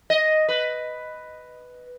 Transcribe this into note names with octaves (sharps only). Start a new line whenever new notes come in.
D#5
B4